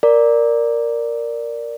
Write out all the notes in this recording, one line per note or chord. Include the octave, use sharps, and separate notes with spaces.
A#4 D5